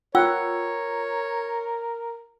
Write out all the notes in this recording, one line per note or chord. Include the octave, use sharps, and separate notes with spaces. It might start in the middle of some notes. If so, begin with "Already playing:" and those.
F4 A#4 C#5 F#5 G5 E6